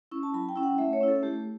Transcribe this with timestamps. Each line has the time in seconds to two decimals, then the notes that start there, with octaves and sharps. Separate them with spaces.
0.11 C#4 E4 C#6
0.23 A5
0.34 F#3 B5
0.49 G5
0.56 C#4 E4
0.63 F#5
0.78 A3 E5
0.93 C#5
1.00 C#4 E4
1.08 A4
1.23 A3 G4